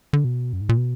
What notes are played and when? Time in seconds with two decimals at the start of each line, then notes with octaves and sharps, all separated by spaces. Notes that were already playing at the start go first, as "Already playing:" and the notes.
0.13 D3
0.24 B2
0.53 F#2
0.61 G#2
0.69 A#2
0.77 B2